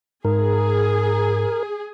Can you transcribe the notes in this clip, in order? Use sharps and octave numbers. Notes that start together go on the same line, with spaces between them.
G#2 G#4 A#4